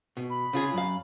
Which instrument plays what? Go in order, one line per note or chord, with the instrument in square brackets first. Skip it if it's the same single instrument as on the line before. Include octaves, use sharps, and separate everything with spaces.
[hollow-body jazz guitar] B2
[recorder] B5
[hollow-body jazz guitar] C#3 F4 G#4
F#2 F5